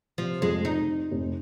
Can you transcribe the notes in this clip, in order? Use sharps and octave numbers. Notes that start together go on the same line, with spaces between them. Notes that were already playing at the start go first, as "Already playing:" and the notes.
C3 F3
F2 G#3
F1 D#4
C3
F1